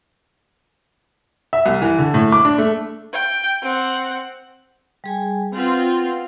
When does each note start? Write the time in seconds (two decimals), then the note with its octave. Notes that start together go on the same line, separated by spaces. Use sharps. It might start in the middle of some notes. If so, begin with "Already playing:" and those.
1.53 E5
1.66 C2
1.81 E3
1.99 D3
2.14 A2
2.32 D6
2.45 D4
2.58 A3
3.13 G5
3.62 C4 F#5
5.04 G3 G#4 G#5
5.56 C4 F4 B4 F5 F#5